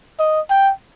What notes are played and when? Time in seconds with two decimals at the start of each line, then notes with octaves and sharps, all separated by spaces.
0.19 D#5
0.50 G5